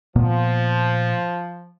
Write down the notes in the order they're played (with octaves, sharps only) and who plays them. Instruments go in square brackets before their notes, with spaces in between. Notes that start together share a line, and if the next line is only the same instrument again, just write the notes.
[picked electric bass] A#2 A#3 B3 [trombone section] F3